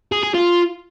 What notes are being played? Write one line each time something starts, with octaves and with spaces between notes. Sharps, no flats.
G#4
G#4
F4